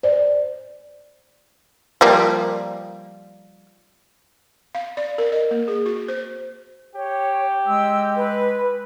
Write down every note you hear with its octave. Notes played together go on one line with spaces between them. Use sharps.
C5 D5
F3 G3 A#3
F5
D5
A#4
D#5
A#3
G#4
F#4
C5
G4 C#5
G#3 E6
B4